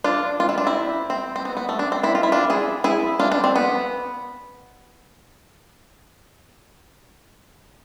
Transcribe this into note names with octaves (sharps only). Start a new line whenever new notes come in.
D4 F4
F4
E4
D4
C4 E4
C4
C4
B3
B3
A3
D4
C4
C4 E4
F4
E4
D4 F4
E4 G#4
E4 G#4
D4 F4
D4
C4
B3